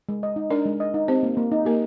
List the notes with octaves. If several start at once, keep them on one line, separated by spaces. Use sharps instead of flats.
G#3
D#5
D#4
D4 A#4 D5
G#3
D#5
D#4
C4 G4 C5
A#3
A#3
D#4
A#3 G4 A#4